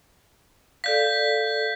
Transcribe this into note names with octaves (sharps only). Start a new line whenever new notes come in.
A4 D5 F5 G6 B6